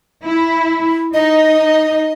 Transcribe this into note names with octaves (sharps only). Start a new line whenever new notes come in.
E4
D#4 D#5